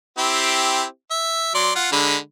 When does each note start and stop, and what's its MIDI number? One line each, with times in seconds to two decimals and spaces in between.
0.18 0.84 60
0.18 0.84 64
0.18 0.84 67
1.11 1.52 76
1.55 1.71 54
1.55 1.71 74
1.55 1.71 84
1.76 1.90 65
1.76 1.90 78
1.92 2.16 50
1.92 2.16 56
1.92 2.16 83